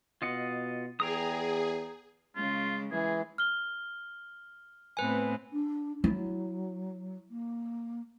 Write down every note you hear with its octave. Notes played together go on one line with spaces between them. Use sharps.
B2 F4 D#5 F#5
E2 G#4 G5 A#5 D#6
C#3 G#3 F4
E3 G#3 G#4
F6 G7
A2 B3 C4 B4 G#5
D4
F#3 E4
A#3